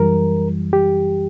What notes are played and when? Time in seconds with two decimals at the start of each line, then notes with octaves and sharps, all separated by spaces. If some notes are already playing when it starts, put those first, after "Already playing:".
Already playing: F#2 E3 G3 A#4
0.73 G4